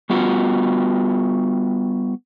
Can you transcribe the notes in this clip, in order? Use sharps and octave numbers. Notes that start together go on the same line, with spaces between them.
G3 B3 F4 F#4